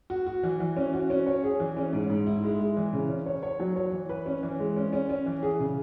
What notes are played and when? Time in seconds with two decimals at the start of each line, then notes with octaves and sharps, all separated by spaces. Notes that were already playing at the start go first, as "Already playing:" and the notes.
0.10 F#4
0.26 F#4
0.43 E3
0.60 E3
0.77 C#4
0.93 F#4
1.10 C#4
1.26 C#5
1.44 G#4
1.60 E3
1.77 C#4
1.93 G#2
2.10 G#2
2.27 E4
2.43 G#3
2.59 G#3
2.76 E3
2.93 C#3
3.09 C#4
3.26 C#5
3.43 C#5
3.60 F#3
3.76 C#5
3.93 E3
4.09 B4
4.26 C#4
4.43 E3
4.59 G#3
4.77 C#4
4.93 C#4
5.09 C#4
5.26 E3
5.43 G#4
5.59 C#3